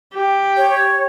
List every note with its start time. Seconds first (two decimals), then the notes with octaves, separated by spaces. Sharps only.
0.14 G4
0.57 C#5